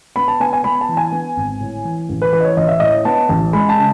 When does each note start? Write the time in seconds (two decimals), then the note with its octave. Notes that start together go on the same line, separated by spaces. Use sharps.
0.16 B3 B5
0.28 A5
0.40 B3 G#5
0.53 G#5
0.64 B3 B5
0.81 A5
0.89 E3
0.97 G#5
1.12 B3
1.36 G#1
1.61 A2
1.85 E3
2.09 A1
2.22 B4
2.32 E3 B4
2.40 D#5
2.45 C#5
2.57 A1 D#5
2.68 E5
2.80 A2 D#5
3.05 B3 A5
3.29 A1
3.53 G#3 B5
3.69 A5
3.78 C#3